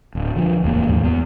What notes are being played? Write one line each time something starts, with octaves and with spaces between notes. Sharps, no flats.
D1
D3 F3
D1 E2 D#3 A#3
D#2 G#2 E3 F#3
E2 B3